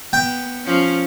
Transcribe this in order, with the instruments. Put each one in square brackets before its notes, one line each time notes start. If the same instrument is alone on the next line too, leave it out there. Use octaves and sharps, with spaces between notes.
[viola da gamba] B3 [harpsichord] G5
[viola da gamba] F3 C#4